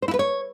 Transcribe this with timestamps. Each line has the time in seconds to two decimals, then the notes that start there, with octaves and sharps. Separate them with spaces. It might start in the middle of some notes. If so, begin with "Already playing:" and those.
0.02 C5
0.08 E4
0.14 B4
0.19 C#5